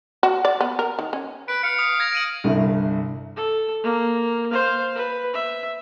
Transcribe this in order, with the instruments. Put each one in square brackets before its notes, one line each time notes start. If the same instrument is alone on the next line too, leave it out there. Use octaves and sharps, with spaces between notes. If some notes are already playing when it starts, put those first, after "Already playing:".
[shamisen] F#4
D5
B3
A#4
D#3
C#4
[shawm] B4 [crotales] D7
[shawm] F5 [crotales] C#7
[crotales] D#6
G#6 A#6
D7 D#7 F#7
[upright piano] G1 C2 G2
[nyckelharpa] A4
A#3
C5 F5
B4
E5